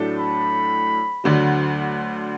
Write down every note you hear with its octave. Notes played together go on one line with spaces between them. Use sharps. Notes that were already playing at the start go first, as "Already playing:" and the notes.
Already playing: A2 F#3 A3 D4 A4
B5
D2 D3 F#3